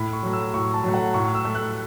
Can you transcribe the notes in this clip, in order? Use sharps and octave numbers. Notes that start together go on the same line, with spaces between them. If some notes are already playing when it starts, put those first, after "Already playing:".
Already playing: A2 B5
C#6
F#3 A3
E6
A2 C#6
A5
F#3 A3
F#5
A2 C#6
E6
A3
F#6